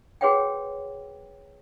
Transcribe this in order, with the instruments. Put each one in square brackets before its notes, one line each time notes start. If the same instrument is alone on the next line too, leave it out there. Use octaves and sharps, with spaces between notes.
[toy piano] F#4 G#4 B4 C#5 F#5 G5